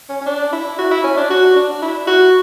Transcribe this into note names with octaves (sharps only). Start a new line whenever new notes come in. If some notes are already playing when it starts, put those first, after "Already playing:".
C#4
C#4
D4
E4
F#4
E4
C#4
D4
F#4
D4
E4
F#4